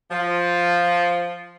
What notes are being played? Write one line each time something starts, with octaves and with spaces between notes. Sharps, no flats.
F3